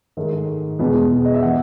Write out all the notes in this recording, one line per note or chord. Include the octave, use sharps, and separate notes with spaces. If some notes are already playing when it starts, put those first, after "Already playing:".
G#2 D#3 A3
E2 B2 G#3 B3
D#5
E5
E3 B3 F#5